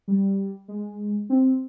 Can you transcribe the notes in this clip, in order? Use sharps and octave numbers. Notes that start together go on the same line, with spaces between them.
G3
G#3
C4